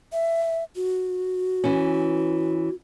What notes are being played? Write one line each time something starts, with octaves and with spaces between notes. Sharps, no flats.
E5
F#4
E3 C#4